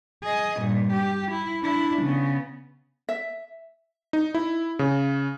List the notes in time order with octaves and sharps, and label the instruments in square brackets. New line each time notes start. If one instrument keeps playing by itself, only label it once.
[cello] G#4 D#5
G2 A#2
G4
E4
D4 E4
C#3 B3
[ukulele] E5
[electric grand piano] D#4
E4
C#3